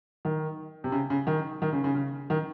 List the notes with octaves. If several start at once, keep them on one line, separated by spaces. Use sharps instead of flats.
D#3
C3
C#3
C#3
D#3
D#3
C#3
C#3
C#3
D#3